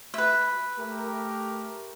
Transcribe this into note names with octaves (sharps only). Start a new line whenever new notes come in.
B4 E5
A3 G4 A#4